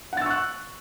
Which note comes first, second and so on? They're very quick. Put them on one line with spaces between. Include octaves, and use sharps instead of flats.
F#5 A6 E6 C#6 F#6